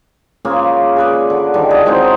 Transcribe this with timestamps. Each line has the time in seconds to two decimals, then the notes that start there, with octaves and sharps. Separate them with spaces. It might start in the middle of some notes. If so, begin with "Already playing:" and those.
0.45 C#3 A#3 F4 G#4
0.96 G#4 B4 D5
1.30 D3
1.54 D3 D#3 G3
1.70 E4 G#4 A#4
1.86 F#3 G#3 C4 D#4